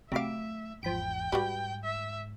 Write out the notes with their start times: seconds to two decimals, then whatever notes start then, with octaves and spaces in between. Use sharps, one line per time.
0.12 C3 F#3 A3 E5 F5 B5 D6
0.83 G#1 E2 F3 G5 B5 D7
1.32 G#2 G3 F#4 G4 B4
1.85 E5